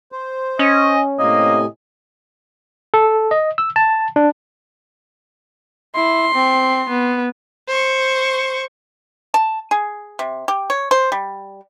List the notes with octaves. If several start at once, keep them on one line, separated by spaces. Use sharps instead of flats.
C5
C#4 D#5
A2 C3 A#3 D#5 G#5
A4
D#5
E6
A5
D4
E4 C6
C4
B3
C5 C#6
A5
G#4
C3
G4
C#5
C5
G3